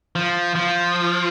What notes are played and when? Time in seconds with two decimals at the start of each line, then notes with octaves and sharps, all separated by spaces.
0.16 F3
0.55 F3